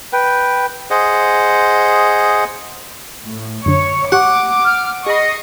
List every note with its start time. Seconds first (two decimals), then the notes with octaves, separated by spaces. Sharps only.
0.13 B4 G5
0.90 G#4 C5 D#5 F#5
3.24 A2
3.66 F#2 D3 C#5
4.12 G4 F#5 C#6 D6
4.65 F6
5.06 G#4 D#5 B5 C#6 D#6 C7